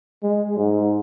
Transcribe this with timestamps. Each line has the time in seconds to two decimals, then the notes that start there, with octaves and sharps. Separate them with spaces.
0.23 G#3
0.57 G#2